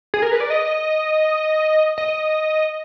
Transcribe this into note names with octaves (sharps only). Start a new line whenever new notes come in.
G#4
A#4
B4
D5
D#5
D#5